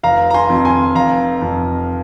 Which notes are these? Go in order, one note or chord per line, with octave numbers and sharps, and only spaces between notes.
F1 F5 A#5
A#5
G#5 C6
F2
G#5 C6
F1 F5 A#5
F2